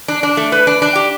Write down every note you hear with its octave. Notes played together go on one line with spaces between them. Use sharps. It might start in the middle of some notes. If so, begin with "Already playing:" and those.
D4
D4
A3
B4
D4
D4
G4